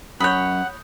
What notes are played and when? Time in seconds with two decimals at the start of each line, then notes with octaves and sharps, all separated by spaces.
0.20 F#2 C#5 F#5 B5 D#6 F#6 G6